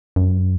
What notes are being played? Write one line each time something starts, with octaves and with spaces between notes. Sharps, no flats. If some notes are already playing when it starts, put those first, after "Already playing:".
F#2